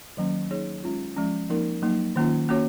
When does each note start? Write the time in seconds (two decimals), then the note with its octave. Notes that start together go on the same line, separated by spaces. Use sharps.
0.17 D#3 F#3 A#3 C#4
0.51 A#3 D#4 G#4 C#5
0.84 G#3 C#4 F4
1.16 F3 G#3 C#4
1.49 F3 A#3 D#4 A#4
1.82 F#3 A#3 D#4
2.16 D#3 A#3 C#4 F4
2.49 A#3 C#4 F#4 C#5